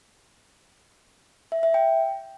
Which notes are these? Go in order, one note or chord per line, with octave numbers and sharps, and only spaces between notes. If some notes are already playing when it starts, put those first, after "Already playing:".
E5
E5
G5